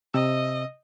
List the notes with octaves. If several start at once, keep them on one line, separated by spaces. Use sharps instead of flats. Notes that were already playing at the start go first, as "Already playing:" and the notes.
C3 D#5 E6